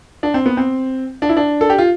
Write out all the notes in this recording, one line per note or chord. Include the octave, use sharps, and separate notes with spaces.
D4
C4
B3
C4
D4
E4
D4
A4
G4
F4